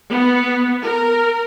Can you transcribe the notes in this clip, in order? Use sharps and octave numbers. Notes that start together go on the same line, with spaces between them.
B3
A#4